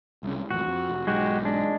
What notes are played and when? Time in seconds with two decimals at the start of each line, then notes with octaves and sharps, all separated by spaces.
0.23 C2 C#3
0.51 A1 F2 F#4
0.67 F2
0.89 F1
1.07 B1 G#2 G#3 F#4 G4
1.45 G#3 D4